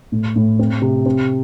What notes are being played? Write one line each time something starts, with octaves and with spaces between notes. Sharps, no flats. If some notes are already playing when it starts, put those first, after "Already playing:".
A2
A2
C4
C3
C4